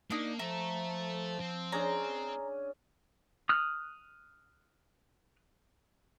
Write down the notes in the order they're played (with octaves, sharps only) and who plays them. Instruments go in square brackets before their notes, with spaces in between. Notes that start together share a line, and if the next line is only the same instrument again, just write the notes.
[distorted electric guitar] A#3 [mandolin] D4 D#4
[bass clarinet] F3 [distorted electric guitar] A4 E5 [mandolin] A#5
[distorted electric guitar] C4
[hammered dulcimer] C#4 D4 G#4 [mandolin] A#5
[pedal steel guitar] D#6 F6 F#6